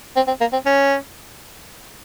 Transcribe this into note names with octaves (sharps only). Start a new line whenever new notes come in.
C4
C4
A#3
C4
C#4